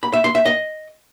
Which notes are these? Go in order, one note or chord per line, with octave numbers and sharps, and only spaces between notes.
B5
E5
C6
E5
D#5